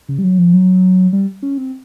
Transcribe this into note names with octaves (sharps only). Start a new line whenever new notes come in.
C#3
G3
F#3
F3
F#3
G3
C#4
C4